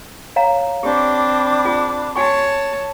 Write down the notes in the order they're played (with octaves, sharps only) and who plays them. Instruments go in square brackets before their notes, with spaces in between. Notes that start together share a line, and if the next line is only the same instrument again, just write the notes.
[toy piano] C#5 F5 A#5
[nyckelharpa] C4 [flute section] D4 B5 D6 [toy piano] G4
[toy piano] F4 G#4
[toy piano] F#4 G#5 C#6 [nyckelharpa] C#5 A5